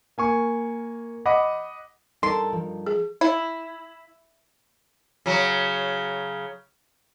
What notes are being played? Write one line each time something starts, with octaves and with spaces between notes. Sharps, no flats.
A#3 G#5 C#6
D#5 F#5 B5 D6
G2 D#4 A4 A#4 A5 C6
F3
G#4
E4
C#3 F#3